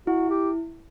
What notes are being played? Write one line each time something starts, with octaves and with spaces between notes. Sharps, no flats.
E4 F#4
G4